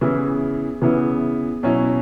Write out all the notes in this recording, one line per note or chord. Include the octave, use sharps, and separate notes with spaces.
C#3 E3 B3 E4
C#3 E3 B3 E4
B2 F#3 C#4 E4